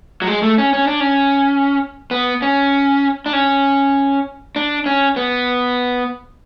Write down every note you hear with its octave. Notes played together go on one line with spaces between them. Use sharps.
F#3
G#3
A3
C#4
C#4
D4
C#4
B3
C#4
D4
C#4
D4
C#4
B3